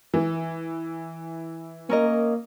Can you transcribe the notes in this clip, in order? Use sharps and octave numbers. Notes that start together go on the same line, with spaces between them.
E3
A#3 C#4 A#4 D#5